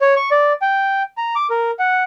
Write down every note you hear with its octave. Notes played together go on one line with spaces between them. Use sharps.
C#5
C#6
D5
G5
A#5
D6
A#4
F#5